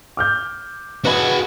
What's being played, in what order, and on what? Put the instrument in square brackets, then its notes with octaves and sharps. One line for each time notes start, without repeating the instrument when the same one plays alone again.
[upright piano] D6 F6 G6
[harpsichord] B2 [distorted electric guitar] F#4 G#4 [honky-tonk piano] B4 B5